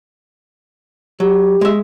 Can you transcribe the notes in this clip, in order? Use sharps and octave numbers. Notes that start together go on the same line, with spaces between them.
F#3 G4
G#3 E5